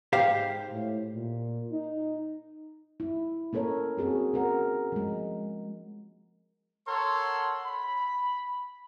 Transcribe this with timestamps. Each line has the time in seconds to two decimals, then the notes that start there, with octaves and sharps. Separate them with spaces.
0.13 G#2 G4 C5 F5
0.72 A2
1.13 A#2
1.72 D#4
3.00 E4
3.53 A#3 C#4 A4 A#4 C#5
3.97 C4 F#4 G#4
4.34 C#4 A#4 F#5
4.92 F3 G#3
6.88 A4 A#4 C#5 F#5 C6
7.65 B5